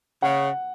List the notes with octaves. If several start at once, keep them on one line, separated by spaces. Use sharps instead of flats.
C#3 F#5